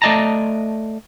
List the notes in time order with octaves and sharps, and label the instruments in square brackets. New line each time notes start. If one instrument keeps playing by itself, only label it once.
[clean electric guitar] A3 D5 D#5 A5 A#5